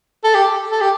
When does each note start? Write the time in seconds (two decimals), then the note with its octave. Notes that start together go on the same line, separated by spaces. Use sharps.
0.24 A4
0.34 G4
0.71 A4
0.81 G4